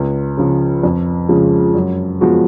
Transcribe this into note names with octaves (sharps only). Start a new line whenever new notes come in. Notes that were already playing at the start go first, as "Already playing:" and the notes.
Already playing: C#2
C#3 F3
F2
C#3 F3 G#3
F#2
F3 G#3 B3 F#4